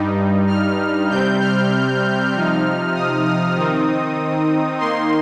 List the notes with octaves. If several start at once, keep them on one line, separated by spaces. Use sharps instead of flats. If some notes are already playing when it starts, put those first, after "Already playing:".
Already playing: G2 G3 D#4
F6
C3 G3 C4 G6
F6
C3 F3 D#4
D#6
D#6
D#3 C4 D#4
D#3 A#3 D#4 C6